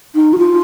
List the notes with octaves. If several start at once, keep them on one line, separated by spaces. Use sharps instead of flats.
D#4
F#4
F4